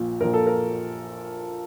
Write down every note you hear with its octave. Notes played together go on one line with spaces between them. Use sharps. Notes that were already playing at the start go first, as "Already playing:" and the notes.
Already playing: A#1 A#2 F3
A#1 A#2 F3 A#4
A4
A#4